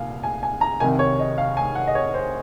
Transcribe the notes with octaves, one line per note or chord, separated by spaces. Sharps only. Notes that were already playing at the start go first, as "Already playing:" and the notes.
Already playing: C2 A#2 F5 G#5
G#5
G#5
A#5
C2 C3 D#3 G#5
C#5
D#5
F5
G#5
F#5
D#5
C#5
C5